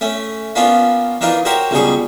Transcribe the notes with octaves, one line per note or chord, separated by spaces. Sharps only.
A3 C#4
A#3 B3 C#4 D4 F4
E3 D4 D#4 F4 A#4
F#4 G4 A#4 C5 C#5
C#2 B2 F#3 G3 G#4 C#6